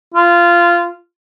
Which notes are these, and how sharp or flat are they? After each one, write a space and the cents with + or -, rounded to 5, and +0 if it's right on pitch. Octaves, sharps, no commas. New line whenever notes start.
F4 -15